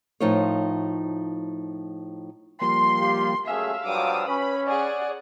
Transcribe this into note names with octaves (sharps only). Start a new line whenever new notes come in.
A2 F3 D#4 F4 A#4 C#5
F3 G3 A#3 C6
F4 G4
F#2 A3 G#4 E5 F5 E6
G2 F3 F#3 D6 D#6
C#4 B4 B5
G#4 C#5 D5 F#5